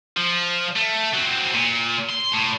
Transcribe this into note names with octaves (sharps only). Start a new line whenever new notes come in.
F3
A3
F#3 C4
A#2
C6
A2